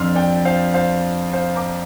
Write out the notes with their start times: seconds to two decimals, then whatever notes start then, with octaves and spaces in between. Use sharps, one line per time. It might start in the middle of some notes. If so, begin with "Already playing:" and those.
Already playing: F2 F3 D4 C6 F6
0.15 D5 G5
0.45 C5 F5
0.74 C5 F5
1.33 C5 F5
1.56 A#5 D6